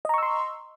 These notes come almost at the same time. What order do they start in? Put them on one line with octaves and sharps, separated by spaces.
D#5 A#5 C#6 E6 C6